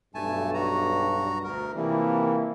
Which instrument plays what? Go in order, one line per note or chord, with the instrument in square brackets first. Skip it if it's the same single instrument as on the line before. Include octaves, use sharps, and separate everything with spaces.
[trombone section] B1 G2 [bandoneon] A3 G#5 A5
[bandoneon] F#4 A#5
D2 A#4
[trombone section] C3 E3 A#3 [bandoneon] F3 G3